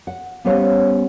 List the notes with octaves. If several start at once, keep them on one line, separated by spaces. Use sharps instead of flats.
F#5
G3 B3 C#4 C5 C#5 F5